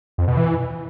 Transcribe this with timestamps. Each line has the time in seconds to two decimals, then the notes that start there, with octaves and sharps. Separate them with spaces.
0.18 F2
0.28 B2
0.37 E3